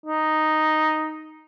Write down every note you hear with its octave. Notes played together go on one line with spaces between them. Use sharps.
D#4